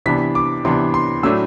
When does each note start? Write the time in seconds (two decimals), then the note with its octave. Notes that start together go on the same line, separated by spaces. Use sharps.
0.06 C3 E3 B3 D4 B6
0.35 D6
0.65 C3 E3 B3 D4 C6
0.94 C6
1.23 A2 F#3 A3 D4 E6